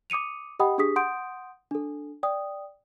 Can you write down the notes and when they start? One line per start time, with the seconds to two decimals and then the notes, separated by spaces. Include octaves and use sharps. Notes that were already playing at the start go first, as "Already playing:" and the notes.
0.10 D6 D#6 C#7 D#7 F7
0.59 G4 D#5 F#5 G5 B5 D#6
0.78 D4 G4 G#4 D#6 B6
0.96 F#5 C6 D#6 G6 D7
1.71 D4 A4
2.23 D5 G5 D#6